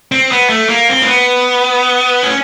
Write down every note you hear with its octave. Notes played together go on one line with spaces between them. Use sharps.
C4
B3
A3
A#3
C4
A#3
B3
C#4